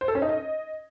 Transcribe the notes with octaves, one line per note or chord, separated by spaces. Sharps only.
C5
A4
C#4
D#4
D#5